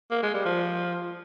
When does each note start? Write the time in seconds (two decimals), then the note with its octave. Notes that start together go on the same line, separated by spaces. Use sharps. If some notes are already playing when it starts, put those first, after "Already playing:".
0.11 A#3
0.23 G#3
0.34 G3
0.46 F3